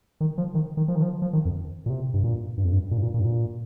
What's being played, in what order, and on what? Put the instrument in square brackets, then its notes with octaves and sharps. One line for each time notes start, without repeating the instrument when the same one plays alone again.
[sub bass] D#3
F3
D#3
D#3
F3
D#3
F3
F3
D#3
F2
A#2
C3
G2
A#2
G2
F2
G2
A#2
G2
A#2
A#2
G2
A#2